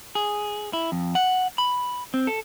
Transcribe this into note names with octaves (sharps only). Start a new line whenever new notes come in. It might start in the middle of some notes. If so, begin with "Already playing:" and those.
G#4
E4
F2
F#5
B5
C4
A4